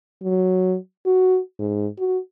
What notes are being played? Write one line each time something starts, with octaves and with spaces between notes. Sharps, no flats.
F#3
F#4
G#2
F#4